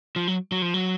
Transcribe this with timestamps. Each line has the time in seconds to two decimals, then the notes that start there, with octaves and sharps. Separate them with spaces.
0.16 F3
0.27 F#3
0.52 F#3
0.62 F3
0.74 F#3